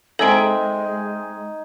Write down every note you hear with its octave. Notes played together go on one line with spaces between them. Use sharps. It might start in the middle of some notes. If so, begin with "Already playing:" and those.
G#3 C4 D#4 A4 E5 G#5 A#5 D7